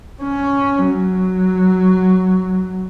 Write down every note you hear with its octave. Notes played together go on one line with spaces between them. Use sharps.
C#4
F#3